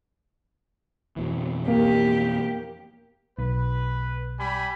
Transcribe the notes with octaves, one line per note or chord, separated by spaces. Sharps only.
F2 B2 E3
A#3 G4
B1 B4
G3 G#5 B5